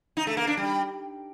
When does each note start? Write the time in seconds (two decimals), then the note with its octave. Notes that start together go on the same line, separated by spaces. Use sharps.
0.17 D#4
0.27 A3
0.37 A#3
0.47 D4
0.57 G3